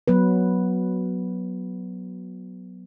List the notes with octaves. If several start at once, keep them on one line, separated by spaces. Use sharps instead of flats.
F#3 B3 B4